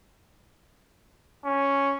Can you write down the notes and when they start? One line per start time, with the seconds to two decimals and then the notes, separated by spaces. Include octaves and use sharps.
1.45 C#4